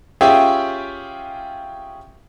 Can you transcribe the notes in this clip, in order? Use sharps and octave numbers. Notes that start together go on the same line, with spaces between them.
C#4 F4 G4 G#4 E5 G5